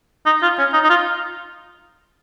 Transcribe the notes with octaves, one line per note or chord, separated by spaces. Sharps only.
D#4
F4
C#4
D#4
D#4
F4